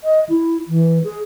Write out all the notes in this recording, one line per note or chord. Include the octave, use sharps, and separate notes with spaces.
D#5
E4
E3
G#4